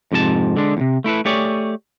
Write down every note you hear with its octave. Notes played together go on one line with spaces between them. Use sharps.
F2 G#2 C3 A4 A5
D3 G#3 D4
E2 C3
A3 E4 A4 B4
A3 G4 G#4 C#5 D5